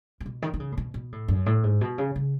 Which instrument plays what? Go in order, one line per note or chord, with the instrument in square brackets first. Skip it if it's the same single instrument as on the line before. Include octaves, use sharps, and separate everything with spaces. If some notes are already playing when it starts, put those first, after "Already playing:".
[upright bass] A2
B2
D#3
D#3
C#3
A2
B2
B2
A2
F#2
A2
G#2
B2
C#3
C#3